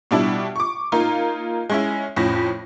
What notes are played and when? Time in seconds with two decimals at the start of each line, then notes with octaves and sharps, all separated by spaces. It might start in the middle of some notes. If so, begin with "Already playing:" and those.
0.11 B2 G3 D4 E4
0.56 C#6 D6
0.92 A#3 D#4 F4
1.70 G#3 C#4 E4
2.16 F2 A2 C#4 A#6